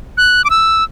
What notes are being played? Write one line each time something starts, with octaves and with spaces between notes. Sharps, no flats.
F#6
D6
E6